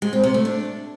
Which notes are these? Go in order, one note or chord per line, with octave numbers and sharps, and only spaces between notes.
G#3
C4
C3
A3
D4